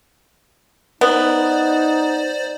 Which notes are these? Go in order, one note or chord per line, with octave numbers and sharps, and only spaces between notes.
B3 D#4 C5 D5